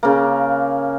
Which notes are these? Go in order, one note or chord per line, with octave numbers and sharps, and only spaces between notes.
C#3 A#3